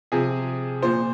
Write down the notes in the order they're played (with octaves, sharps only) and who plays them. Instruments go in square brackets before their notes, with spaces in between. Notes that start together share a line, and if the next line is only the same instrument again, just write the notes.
[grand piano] C3 F3 G#4
A#2 F3 C5